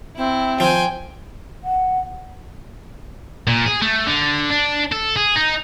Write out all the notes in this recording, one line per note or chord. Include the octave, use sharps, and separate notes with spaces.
C4 E4
F3 G5 G#5
F#5
A#2
G#4
A3
D3
D4
A4
G#4
D#4